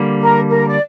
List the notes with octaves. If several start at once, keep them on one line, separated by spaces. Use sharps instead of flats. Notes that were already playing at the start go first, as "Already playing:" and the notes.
Already playing: D3 G3 A#3
A#4
A#4
D5